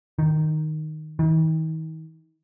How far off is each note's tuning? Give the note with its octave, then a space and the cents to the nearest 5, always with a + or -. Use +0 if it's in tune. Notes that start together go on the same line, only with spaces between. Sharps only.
D#3 -5
D#3 +40